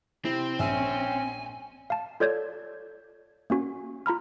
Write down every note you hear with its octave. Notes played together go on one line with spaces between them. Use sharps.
C3 C4 E4
A#1 C#4 E5 G#5 E6
F5 A5
F4 A4 C#5 D5 G6 G#6
A#3 C#4 F#4
F4 A#5 B5 F6